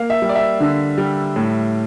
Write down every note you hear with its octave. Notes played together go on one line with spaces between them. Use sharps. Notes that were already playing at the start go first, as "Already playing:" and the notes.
Already playing: A#3 F5
E5
G3
D5
E5
D3
G3
A2